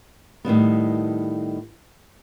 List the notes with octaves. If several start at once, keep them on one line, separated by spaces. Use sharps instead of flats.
A2 D#3 G3 B3